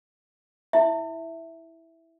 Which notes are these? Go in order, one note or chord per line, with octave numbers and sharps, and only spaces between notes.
E4 E5